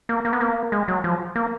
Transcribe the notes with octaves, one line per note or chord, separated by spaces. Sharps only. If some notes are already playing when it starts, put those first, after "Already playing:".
A#3
A#3
B3
A#3
G#3
F#3
F3
A#3